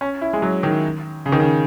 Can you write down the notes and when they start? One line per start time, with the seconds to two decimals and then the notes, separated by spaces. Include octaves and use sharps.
0.01 C#4
0.22 E4
0.33 G#3
0.42 F#3
0.63 D#3
1.26 C#3
1.32 D#3
1.40 C#3